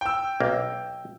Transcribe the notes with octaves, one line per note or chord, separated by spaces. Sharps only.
G5 E6
B1 A#3